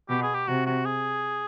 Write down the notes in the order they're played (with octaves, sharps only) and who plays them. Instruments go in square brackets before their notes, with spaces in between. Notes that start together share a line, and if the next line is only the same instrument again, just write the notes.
[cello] B2 [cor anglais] G4
[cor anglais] G#4
G4
[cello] C3 [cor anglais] F#4
[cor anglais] F#4
G#4